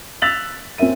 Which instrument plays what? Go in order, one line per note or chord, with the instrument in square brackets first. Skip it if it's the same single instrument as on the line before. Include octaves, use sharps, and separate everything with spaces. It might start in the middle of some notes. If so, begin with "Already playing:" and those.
[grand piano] E6 F#6 A6 B6 F7 F#7
C4 C#4 A#4 E5 D#7